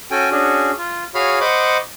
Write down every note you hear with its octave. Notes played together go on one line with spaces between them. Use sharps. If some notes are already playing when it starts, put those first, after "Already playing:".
C#4 F#4 A4 G5 G#5
C#4 D4 F#4 G#4
F4
F#4 G#4 C#5 F5 B5 F6
C5 D#5 F#5 B5 C#6 D6